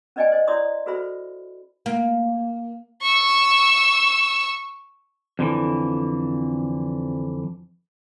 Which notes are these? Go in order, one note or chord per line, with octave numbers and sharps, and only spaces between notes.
C#4 B4 D5 D#5 G5 G#5
C5 D#5
E4 C#5 D5 C6 D#6
F#4 A4 B4 C5 E5 B5
A#3
C#6 E6
F2 D3 E3